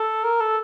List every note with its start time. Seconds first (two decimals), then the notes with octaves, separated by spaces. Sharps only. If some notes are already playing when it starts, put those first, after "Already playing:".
Already playing: A4
0.24 A#4
0.40 A4